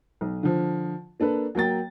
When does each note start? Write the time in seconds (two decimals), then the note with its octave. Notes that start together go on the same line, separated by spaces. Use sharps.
0.21 B1
0.43 D3 F3
1.20 A#3 D4 A4 B4
1.55 F#3 A#3 G5 A6